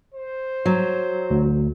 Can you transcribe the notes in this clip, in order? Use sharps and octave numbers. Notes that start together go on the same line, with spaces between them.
C5
F#3
D2